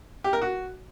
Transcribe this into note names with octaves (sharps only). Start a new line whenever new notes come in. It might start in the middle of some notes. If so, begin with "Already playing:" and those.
G4
A#4
F#4